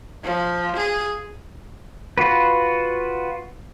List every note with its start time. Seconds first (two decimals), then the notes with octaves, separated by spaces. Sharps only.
0.24 F3
0.76 G#4
2.18 F4 F#4 B4